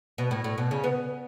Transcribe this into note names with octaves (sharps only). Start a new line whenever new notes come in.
B2
A2
A2
B2
C#3
B3